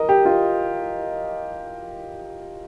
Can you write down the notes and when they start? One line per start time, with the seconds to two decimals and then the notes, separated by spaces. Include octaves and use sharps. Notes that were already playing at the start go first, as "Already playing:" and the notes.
Already playing: A#4 D#5
0.09 G4
0.25 F4